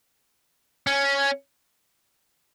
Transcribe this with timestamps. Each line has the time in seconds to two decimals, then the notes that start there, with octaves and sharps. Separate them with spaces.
0.87 C#4